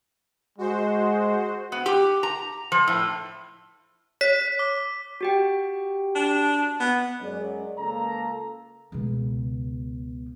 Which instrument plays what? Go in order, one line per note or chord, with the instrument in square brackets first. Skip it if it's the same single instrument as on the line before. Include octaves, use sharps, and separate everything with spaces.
[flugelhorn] G#3 [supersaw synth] F#4 C5
[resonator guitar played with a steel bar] B3
G4
A#5
F3
A2
[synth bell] C#5 [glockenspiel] B6
[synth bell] D6
[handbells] F#4 G4 G5
[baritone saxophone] D4
B3
[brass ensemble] F#2 F#3 G#3 C#4 G#4 D5
C#2 A#3 A4 A#5
[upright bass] C#2 B2